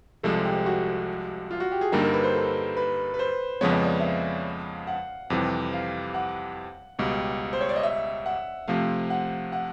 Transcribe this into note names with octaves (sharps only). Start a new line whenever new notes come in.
C2 C3 F3 G#3 A4
G4
F#4
F4
F#4
G4
G#4
G2 D3 G3 A#3 D#4 A#4
A#4
B4
C5
A4
B4
B4
C5
F2 C#3 F3 G#3 B3 C#5
D#5
D5
E5
F5
F#5
F2 C3 E3 G3
F5
F#5
C#2 B2 G3
C5
C#5
D5
D#5
E5
F#5
C3 F3 A3 F5
F#5
F#5